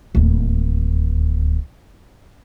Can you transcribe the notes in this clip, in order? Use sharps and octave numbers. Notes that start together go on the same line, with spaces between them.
D1 D#2